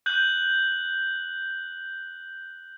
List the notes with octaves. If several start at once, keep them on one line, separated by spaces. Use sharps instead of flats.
F#6 G6 F#7